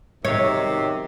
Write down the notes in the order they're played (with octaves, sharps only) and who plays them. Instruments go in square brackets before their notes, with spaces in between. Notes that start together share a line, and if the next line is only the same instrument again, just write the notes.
[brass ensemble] B1 D#3 [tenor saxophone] C3 [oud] C#5